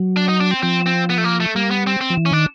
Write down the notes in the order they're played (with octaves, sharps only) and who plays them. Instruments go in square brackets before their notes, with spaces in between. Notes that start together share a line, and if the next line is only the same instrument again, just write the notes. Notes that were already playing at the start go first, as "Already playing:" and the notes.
Already playing: [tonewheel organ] F#3
[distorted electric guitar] D4
D#4
D4
C4
[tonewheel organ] F3 [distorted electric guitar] C4
[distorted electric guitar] C4
B3
A3
A#3
A3
[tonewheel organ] G3 [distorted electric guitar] A#3
[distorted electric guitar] B3
C4
C4
[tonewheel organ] F3
E3
[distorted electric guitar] C#4
[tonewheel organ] D#3 [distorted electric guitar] D4